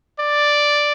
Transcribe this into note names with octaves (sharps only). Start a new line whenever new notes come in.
D5